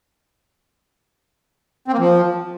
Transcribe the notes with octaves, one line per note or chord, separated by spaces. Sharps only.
C4
A#3
F3